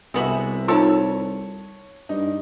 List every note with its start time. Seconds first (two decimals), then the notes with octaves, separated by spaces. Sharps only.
0.14 C2 C3 G#3 B3 F#4 E5
0.68 D#4 F4 A4 C#5 A5
2.09 G2 D#4